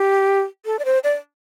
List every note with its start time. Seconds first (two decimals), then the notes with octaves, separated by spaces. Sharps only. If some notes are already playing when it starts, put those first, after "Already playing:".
Already playing: G4
0.66 A4
0.79 D5
0.85 C5
1.04 D5